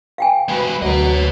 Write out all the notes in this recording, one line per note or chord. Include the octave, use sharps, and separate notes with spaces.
F5 G5 G#5
G#3 F#4 B4
D2 F#3 B4 D#5